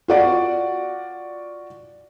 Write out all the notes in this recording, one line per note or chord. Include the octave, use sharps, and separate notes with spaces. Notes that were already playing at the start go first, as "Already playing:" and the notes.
F4 F#4 D5